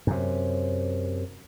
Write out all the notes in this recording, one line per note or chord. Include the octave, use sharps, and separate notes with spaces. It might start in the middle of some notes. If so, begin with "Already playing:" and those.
F#2 C3